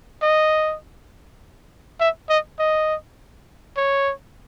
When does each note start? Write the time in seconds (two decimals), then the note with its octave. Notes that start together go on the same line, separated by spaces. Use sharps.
0.23 D#5
2.00 E5
2.29 D#5
2.59 D#5
3.77 C#5